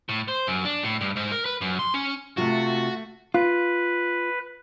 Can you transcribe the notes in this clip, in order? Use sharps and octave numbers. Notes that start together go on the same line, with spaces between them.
A2
C5
F#2
D4
A2
G2
G#2
A#4
B4
F#2
C6
C#4
C3 A3 F4 F#4
F4 B4